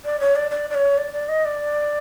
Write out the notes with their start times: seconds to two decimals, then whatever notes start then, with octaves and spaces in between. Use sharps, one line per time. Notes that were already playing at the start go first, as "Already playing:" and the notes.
0.05 D5
0.20 C#5
0.36 D5
0.51 D5
0.70 D5
0.75 C#5
0.98 D5
1.13 D5
1.29 D#5
1.45 D5